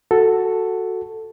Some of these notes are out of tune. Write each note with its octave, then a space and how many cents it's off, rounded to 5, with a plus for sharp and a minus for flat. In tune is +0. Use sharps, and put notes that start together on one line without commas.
F#4 +0 A4 +5